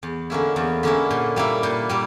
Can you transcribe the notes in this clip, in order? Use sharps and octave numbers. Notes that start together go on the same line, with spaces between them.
E2
D3 A#3 C#4 E4
E2
D3 A#3 C#4 E4
A#2
G3 A#3 E4
A#2
G3 A#3 E4